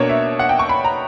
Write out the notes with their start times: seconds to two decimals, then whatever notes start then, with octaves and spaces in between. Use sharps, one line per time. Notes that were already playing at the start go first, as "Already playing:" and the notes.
Already playing: B2 A#3 D4 C#5
0.09 E5
0.39 F#5
0.49 G5
0.59 C#6
0.69 B5
0.84 A#5